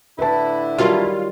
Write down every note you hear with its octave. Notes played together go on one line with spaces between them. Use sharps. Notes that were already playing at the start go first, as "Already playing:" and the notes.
A2 D3 E4 B4 A5
D#3 F#3 G3 F4